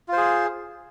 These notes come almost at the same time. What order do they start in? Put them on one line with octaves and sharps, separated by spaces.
F4 C5 G#4